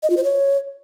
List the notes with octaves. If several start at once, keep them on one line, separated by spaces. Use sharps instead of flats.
D#5
F4
C5
C#5